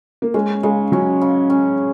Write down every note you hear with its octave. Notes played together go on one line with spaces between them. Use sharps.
A#3
G#3 C#4
C#3 G#3
F#3 C#4
C#3
C#4